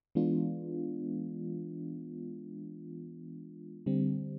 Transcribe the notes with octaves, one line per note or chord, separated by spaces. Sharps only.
E3 G#3 B3 D4 F4
D3 G3 C4